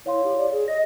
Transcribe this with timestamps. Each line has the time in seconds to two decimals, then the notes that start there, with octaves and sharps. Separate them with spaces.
0.06 E4 C#5 F5 C6
0.24 G4
0.38 D5
0.51 G#4
0.68 D#5 A#6